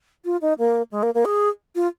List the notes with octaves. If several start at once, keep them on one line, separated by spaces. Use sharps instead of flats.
F4
D#4
A#3
G#3
A#3
A#3
G#4
F4